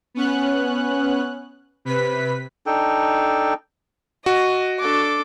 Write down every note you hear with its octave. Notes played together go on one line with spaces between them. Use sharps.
B3 C#4 F#6
C3 B4 B6
D4 D#4 A4 G5
F#4 D#5
D4 A4 D6